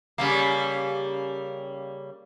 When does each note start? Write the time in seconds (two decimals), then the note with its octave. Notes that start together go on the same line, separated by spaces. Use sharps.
0.18 C#3 G3 A#3